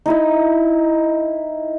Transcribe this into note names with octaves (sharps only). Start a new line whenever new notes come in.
D#4 E4 D#5